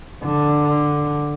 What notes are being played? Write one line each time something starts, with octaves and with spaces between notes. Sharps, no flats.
D3